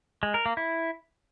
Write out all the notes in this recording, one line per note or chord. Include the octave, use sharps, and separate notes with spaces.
G#3
A#4
A#3
E4